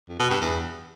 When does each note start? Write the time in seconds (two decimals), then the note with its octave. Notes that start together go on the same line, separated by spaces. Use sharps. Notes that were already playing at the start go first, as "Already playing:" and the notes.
0.09 F2
0.20 B2
0.30 G2
0.41 E2